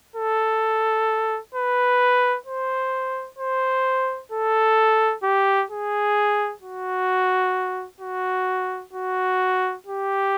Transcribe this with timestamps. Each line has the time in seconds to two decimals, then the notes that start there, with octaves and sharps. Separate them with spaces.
0.16 A4
1.55 B4
2.46 C5
3.39 C5
4.32 A4
5.23 G4
5.70 G#4
6.62 F#4
8.01 F#4
8.93 F#4
9.87 G4